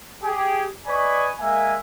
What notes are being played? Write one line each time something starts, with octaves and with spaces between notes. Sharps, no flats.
G4 G#4
B4 D5 D#5 G#5 B5 C#6
G#3 A#3 E5 G#5